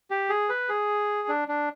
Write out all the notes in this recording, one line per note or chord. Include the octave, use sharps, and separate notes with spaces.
G4
G#4
B4
G#4
D4
D4